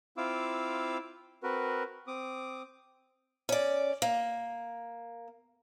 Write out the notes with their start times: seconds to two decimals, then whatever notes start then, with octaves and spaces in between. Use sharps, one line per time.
0.17 C4 E4 F4 F5 D6 E6
1.43 C4 F#4 A#4 B4
2.07 C4 D6 D#6
3.49 C#4 D5
4.02 A#3